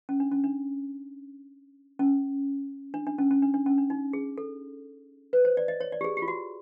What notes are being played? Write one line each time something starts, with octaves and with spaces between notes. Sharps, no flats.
C#4
D4
C#4
D4
C#4
D4
D4
C#4
C#4
D4
D4
C#4
D4
D#4
G#4
A4
B4
C5
D5
D#5
C#5
D5
G4
G#4
G4
F4
F#4